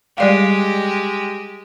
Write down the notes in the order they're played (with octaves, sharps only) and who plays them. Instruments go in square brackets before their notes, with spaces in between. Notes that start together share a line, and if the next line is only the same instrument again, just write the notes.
[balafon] G3 D5 F5 [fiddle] G#3 G4